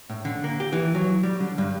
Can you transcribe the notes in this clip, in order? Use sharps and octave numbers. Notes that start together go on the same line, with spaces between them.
A2
D3
A#3
G4
E3
F#3
G3
D3
G2